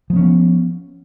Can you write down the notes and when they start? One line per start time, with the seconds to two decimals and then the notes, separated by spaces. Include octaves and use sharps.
0.10 F3
0.13 A#3
0.16 C#4
0.19 B3